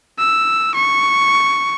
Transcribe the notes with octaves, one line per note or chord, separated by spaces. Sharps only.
E6
C#6